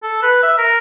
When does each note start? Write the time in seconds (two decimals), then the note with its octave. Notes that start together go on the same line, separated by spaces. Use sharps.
0.03 A4
0.22 B4
0.43 E5
0.58 A#4